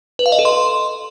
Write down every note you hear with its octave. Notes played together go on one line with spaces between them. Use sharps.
B4
F5
D#5
A4
C6